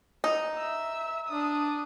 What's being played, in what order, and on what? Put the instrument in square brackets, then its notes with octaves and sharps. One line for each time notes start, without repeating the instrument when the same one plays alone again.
[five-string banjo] D#4
[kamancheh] E5 E6
D4 D#6